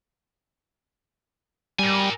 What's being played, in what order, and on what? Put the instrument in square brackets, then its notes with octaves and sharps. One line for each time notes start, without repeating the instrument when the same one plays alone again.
[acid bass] G3 [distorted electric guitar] A#4 G#5